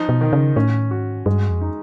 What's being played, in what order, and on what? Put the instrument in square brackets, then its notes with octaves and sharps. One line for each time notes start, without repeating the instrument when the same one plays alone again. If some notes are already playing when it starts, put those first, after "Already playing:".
Already playing: [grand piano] F3 D#4
[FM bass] B2
[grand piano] D#3
[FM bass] C#3
[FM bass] A2 [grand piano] C#4
[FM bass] G#2 [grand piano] F#4
[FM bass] G2 [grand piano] G#3
[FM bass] F2
[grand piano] D#4